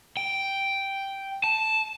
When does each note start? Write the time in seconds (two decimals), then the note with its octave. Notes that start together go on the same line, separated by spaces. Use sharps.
0.17 G5
1.44 A5